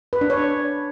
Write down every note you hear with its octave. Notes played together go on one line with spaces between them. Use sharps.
B4
D4
C#5